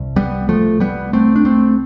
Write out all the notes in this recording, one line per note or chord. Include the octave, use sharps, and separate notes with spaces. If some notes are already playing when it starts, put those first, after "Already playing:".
Already playing: C2
G3 B3
F3 A3
G3 B3
A3 C4
D4
A3 C4